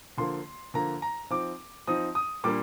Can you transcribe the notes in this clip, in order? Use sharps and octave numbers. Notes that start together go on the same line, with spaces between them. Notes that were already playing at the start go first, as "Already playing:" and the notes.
D3 F3 A#3 C6
D3 F3 A#3 A#5
A#5
F3 C4 D#4 D6
F3 C4 D#4 D#6
D#6
A#2 G3 A#3 D4 D6